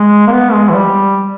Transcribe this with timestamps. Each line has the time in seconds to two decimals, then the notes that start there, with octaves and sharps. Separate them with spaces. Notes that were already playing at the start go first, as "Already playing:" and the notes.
Already playing: G#3
0.27 A#3
0.32 B3
0.53 G#3
0.69 E3
0.74 G3